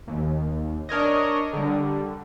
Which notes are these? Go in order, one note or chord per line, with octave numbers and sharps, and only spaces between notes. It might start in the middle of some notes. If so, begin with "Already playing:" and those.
D#2
D4 A#4 C#5 D#5
D3 G3